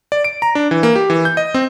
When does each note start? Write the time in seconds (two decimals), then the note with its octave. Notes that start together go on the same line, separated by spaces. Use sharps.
0.12 D5
0.24 D7
0.42 A#5
0.55 D4
0.71 E3
0.83 A#3
0.95 G4
1.10 E3
1.25 G6
1.37 D#5
1.54 C4